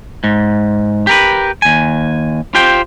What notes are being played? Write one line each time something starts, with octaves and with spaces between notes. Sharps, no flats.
G#2
G4 A#4 B4
D#2 G#5
F4 G4 C5 G5